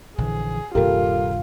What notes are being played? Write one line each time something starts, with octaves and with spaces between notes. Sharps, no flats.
A#1 D3 E3 G#4
D#1 G2 C3 F4 G4 A4 A#4